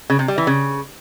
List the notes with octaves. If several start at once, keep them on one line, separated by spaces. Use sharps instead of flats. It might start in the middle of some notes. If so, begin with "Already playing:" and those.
C#3
C3
G3
E3
C#3